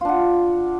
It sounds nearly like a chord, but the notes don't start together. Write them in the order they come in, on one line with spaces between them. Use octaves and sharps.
F4 D4 F#5